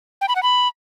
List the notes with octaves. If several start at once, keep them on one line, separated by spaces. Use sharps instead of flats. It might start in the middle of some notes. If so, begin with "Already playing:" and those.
G5
B5
F#5
B5